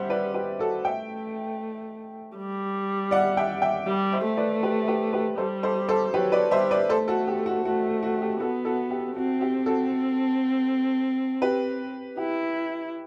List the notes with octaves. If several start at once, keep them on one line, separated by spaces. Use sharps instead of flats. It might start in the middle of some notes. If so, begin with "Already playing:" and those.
Already playing: G3 C5 E5 F#5
B4 D5
G4 B4
F#4 A4
A3 E5 G5
G3
D5 F#5
E5 G5
E5 G5
G3
C5 E5
A3
B4 D5
G4 B4
G4 B4
G4 B4
G3 A4 C5
A4 C5
A4 C5
F#3 G4 B4
B4 D5
G3 C5 E5
B4 D5
A3 A4 C5
F#4 A4
G4
F#4
A3 F#4
F#4
G4
B3 F#4 A4
F#4 A4
G4
C4 F#4
G4
F#4 A4
G4 B4
E4 G4